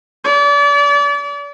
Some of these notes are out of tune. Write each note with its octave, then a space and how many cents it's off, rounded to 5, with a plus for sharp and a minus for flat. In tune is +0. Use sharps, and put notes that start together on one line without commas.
D5 -35